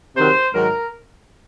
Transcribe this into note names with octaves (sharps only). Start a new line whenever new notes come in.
C3 D#3 F#3 C5
G#2 D#3 F#3 A#4